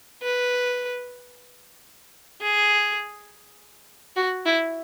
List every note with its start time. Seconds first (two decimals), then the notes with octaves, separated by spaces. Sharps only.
0.22 B4
2.41 G#4
4.16 F#4
4.46 E4